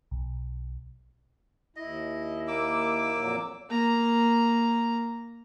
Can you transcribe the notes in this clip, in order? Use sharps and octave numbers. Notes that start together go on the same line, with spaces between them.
B1
D#2 E4 D#5
A#3 D6 E6
F2 A#2 F#3
A#3 A#5